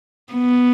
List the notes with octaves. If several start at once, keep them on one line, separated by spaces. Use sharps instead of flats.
B3